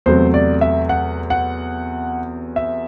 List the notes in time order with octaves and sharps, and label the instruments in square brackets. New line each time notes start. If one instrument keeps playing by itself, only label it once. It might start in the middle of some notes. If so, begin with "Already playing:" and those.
[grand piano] E2 C3 F#3 A3 C5
D5
E5
F#5
F#5
E5